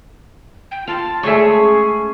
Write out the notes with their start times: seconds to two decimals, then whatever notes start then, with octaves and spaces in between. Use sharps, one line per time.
0.71 G5
0.88 F4 F5 A5
1.23 G#3 A3 G#4 C#5 E5 C#6
1.55 C#4